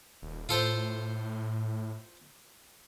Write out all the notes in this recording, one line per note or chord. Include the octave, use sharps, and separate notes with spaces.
D#1
A2 F4 A4 C5